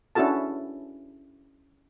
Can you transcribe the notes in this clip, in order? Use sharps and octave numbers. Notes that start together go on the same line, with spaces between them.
C#4 D4 E4 F#4 A4 A5